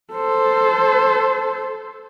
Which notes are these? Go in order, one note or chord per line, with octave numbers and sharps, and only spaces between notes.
A4 C5